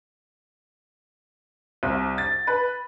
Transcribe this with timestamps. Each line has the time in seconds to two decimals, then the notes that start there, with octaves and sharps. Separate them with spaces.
1.83 C2
2.18 A6
2.47 B4